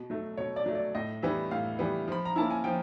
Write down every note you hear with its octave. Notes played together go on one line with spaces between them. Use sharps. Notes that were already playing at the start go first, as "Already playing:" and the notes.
Already playing: B2
F#3 A3
B2 C#5
D5
F#3 A3
D5
A2 D#5
E3 G3 B3 E5
A2 F5
E3 G3 B3
F3 B5
A#5
A#3 C#4 E4 A5
G#5
F3 G5